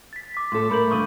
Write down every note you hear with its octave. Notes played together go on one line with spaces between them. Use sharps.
A6 B6
D6 B6
A2 A4 C6
A3 A#4 B5 G6 F#7
G2 D3 D#3 C#6 D#6 D#7